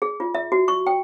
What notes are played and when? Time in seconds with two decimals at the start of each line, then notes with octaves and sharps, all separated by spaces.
0.02 G#4
0.20 F4
0.35 E5
0.52 F#4
0.68 C#6
0.87 G5